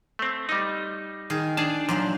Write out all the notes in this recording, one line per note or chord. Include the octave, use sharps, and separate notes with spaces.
A3 C4
G3 D#4
D#3 G#4
D4 G#4 A5
A#2 F3 F#3 C5